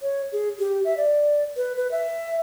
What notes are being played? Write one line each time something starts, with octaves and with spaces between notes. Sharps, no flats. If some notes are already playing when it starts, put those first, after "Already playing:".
C#5
G#4
G4
E5
D5
B4
B4
E5